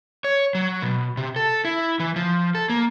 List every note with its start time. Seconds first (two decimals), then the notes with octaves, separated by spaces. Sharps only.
0.24 C#5
0.55 F#3
0.82 B2
1.17 C3
1.36 A4
1.65 E4
2.00 E3
2.16 F3
2.55 A4
2.70 A#3